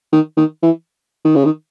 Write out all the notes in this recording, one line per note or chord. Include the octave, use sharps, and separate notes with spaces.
D#3
D#3
E3
D#3
C#3
D#3